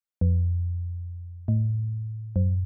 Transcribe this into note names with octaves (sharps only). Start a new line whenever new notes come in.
F2
A2
F#2